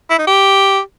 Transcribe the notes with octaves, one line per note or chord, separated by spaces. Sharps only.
E4
D#4
G4